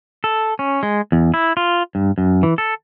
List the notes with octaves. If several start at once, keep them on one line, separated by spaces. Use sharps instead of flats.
A4
C#4
G#3
E2
E4
F4
G2
F#2
E3
A4